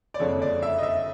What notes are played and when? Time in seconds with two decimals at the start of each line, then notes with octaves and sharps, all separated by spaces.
0.14 D5
0.19 F#1 F2 D3 F3 G#3 C#5
0.42 D5
0.63 E5
0.78 D#5
0.83 E5